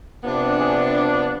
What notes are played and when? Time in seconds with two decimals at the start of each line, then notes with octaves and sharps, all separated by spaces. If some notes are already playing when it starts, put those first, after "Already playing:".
0.23 C3 F3 B3 D4
0.57 G#4